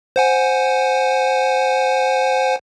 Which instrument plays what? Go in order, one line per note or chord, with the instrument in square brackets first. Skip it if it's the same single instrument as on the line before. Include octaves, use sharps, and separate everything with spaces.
[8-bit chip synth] C5 F#5 G#5